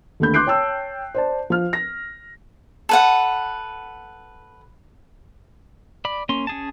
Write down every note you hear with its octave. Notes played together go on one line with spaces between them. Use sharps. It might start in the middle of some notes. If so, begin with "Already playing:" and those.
D#2 D3 A3 B5 G6
C6 D6 F#6 G6 C7 D7
C#5 G5 A5 E6
C5 D5 A5
F3 F6
A#6
A4 B4 F#5
D5 B5
A#3 C#4 C6
C#4 G#4 A5